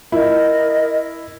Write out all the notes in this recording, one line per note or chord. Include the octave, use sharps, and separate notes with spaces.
E4 A#4 D#5